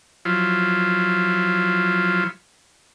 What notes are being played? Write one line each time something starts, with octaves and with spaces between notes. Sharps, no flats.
F3 F#3 E4 F4